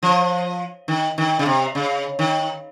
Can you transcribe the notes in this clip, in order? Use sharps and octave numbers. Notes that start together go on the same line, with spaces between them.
F3
D#3
D#3
C#3
C3
C#3
D#3